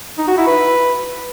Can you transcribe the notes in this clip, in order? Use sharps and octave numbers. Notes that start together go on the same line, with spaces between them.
D#4
F#4
E4
B4